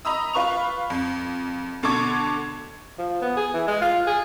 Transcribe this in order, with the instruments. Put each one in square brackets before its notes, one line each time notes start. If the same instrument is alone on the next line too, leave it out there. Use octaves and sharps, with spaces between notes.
[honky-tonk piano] D#5 A#5 B5 D#6 E6
F4 B4 C#6 F7
F2
B2 D3 A4 C#6 D6 G#6
[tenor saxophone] F3
B3
G#4
E3
G#3
F4
G#4